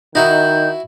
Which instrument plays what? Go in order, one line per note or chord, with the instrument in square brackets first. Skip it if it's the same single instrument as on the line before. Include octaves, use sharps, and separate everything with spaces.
[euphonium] D#3 [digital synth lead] D#4 [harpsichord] E4 F#4 E5 [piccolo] G6